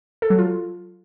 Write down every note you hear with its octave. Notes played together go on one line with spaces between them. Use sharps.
A4
F#3
F4